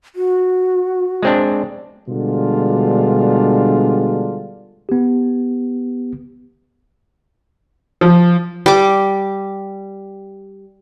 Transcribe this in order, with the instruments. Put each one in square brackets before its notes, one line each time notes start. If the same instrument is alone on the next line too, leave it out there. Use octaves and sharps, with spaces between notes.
[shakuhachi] F#4
[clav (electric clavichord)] G#3 C4 D4
[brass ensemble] B2 D3 G3 G#3 D4 F4
[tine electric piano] B3 G4
[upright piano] F3
[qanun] G3 D6